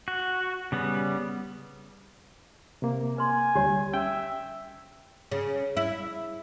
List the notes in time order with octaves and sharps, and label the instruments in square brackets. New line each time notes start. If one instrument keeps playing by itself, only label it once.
[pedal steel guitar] F#4
C#3 G3 B3
[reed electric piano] C3 A#3
[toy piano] B4 C6 [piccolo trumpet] G#5
[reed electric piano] D2 G3 [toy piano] G4 C#5
[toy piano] C#4 [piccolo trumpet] E5 [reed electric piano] G5
[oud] C#3
E4